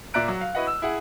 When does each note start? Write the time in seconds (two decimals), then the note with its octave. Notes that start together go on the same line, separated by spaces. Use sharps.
0.14 A#2 D5 E5 A#5 F#6 D7
0.28 F#3
0.41 F5
0.55 E4 F#4 B4 D#5 F#5
0.67 E6
0.82 E4 G#4 F#5